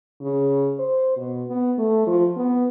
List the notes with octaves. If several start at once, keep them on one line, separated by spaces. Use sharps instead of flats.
C#3
C5
B2
B3
A3
F3
B3